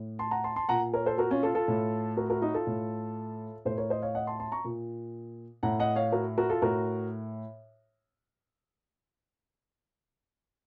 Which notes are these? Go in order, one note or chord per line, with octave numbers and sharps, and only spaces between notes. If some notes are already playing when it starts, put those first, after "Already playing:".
Already playing: A2
A5 C6
F#5 A#5
A5 C6
A5 C6
A#2 F#5 A#5
A#4 C#5
A4 C5
F#4 A#4
C#4 F4
F4 A4
F4 A4
A2
F#4 A#4
F#4 A#4
D#4 F#4
F4 A4
A2
A2 A4 C5
A#4 C#5
C5 D#5
C#5 F5
D#5 F#5
A5 C6
A5 C6
A#5 C#6
A#2
A2 F#5 A#5
D#5 F#5
C#5 F5
F#4 A#4
F#4 A#4
F4 A4
A2 F#4 A#4